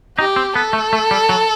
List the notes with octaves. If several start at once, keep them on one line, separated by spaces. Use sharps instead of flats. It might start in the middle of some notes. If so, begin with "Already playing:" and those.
D#4 G4
C4
B3 A4
A3
A3
G3
F#3